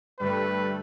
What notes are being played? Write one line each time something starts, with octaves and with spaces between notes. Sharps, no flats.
G2 D3 G3 A3 B4